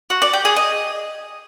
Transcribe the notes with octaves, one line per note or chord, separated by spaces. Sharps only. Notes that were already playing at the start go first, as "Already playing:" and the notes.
F#4
D5
G4
G#4
D#5